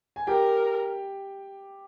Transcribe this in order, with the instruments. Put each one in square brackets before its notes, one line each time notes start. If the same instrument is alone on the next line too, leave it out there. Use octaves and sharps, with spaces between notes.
[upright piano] G#5
[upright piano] G4 G5 [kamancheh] A#4